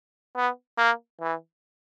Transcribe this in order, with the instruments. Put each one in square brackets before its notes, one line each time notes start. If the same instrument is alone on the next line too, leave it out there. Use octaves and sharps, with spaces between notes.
[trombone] B3
A#3
E3